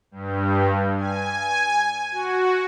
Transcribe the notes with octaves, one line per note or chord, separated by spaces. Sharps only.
G2
G#5
F#4